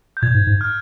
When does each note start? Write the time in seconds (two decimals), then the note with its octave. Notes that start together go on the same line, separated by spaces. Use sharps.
0.17 G6
0.22 A#2 G#6
0.34 G#2
0.47 G#2
0.61 F6